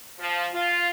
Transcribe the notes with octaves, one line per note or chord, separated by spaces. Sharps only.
F3
F4